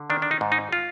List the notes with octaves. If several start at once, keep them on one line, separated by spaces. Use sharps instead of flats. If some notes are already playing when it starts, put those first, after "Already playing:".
Already playing: D3
D#3 D4
D4
D#4
G#2
D#4
F4